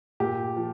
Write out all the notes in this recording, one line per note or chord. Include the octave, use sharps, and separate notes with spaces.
A#2 G4
F3